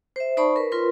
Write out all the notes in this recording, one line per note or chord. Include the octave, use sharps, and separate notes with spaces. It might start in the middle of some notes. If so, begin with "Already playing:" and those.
C5 E5
D#4 C5 D5 A5 B5 C#6
A#4 B4
F4 A#4 B4 C6